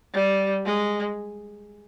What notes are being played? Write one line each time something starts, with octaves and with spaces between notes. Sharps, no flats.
G3
G#3